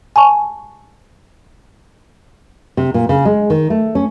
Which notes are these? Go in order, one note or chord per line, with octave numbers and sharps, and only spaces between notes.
G#5 A5 C#6
C3
A#2
C#3
G#3
D#3
A3
C#4